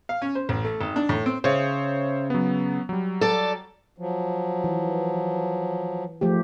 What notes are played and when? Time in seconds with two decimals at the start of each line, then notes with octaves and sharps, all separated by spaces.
0.09 F5
0.22 C#4
0.35 C5
0.49 A1
0.64 A3
0.81 G#1
0.96 D4
1.09 A2
1.26 C4
1.44 C#3 C5 C#5 E5
2.30 F#3 B3
2.89 F#3 G3
3.21 A4 D5
3.98 F3 F#3
4.64 E3
6.21 G#2 F3 A3 G4